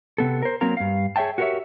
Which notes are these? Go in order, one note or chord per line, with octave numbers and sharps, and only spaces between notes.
C3 B3 A4
A#4 C5
F#3 A#3 C4 A#4 A#5
G2 F5
G#4 C#5 E5 G5 A5
F#4 G4 A#4 B4 C#5 E5